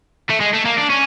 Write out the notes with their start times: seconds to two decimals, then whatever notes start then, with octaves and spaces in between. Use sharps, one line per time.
0.30 A3
0.41 G#3
0.54 A3
0.66 A#3
0.78 D4
0.90 C#4